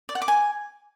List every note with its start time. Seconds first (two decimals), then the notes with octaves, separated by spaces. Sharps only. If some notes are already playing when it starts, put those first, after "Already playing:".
0.09 D5
0.15 F#5
0.22 D6
0.28 G#5